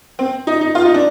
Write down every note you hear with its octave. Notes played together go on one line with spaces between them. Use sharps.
C4
D#4
D#4
F4
D#4
D4